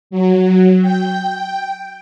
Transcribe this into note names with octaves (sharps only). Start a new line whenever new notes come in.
F#3
G5